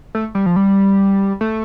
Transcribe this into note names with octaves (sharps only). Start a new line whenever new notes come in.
A3
G3
F3
G3
A3